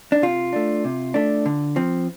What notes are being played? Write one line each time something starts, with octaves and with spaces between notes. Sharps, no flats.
D4
C3 F4
A3 D4
C3
A3 D4
D3
F3 C4